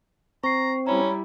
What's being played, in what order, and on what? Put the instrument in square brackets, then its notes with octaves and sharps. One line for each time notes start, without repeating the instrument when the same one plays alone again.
[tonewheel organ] C4 [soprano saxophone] A#5 [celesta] C#6 C7
[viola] G3 E4 [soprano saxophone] C#4 [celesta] A#5 B5